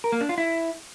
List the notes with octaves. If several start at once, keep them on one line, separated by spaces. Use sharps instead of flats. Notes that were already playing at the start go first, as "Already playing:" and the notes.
A#4
A#3
D4
F4
E4